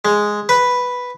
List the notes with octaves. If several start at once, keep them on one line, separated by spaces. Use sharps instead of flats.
G#3
B4